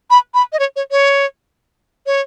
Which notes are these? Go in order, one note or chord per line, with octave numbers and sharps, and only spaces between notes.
B5
B5
D#5
C#5
C#5
C#5
C#5